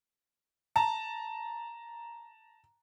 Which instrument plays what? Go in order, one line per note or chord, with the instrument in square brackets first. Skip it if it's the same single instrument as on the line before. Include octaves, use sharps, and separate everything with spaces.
[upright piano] A5 A#5